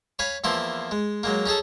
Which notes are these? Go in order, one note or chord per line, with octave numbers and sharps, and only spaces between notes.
C#5 F5 G#5 B5
E2 F3 A#3 E4 C6
G#3
F#3 G#3 A#3
C#4 D#4 G#4 A4